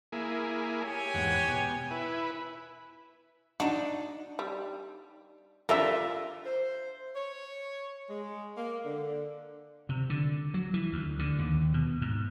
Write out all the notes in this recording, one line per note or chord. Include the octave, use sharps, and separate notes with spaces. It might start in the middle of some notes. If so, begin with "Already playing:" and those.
A#3 E4 G#4
G4 C#5 G#5
E2 G#2 F#5
B2
E4 B4
D4 D#4 F#4
G3
D3 G3 F4 A#4 D5 E5 A#5
C5
C#5
G#3
A#3
D3
C3
D3
F#3
E3
D2
D3
D#2
B2
G#2